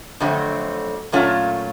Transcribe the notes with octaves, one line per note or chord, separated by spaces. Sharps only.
F2 D3 F#3 A3 C4
A#2 F#3 A3 C#4 F4